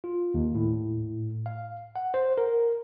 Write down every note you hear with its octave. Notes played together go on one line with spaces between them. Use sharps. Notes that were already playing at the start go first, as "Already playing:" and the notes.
F4
D#2
A2
F5
F#5
C5
A#4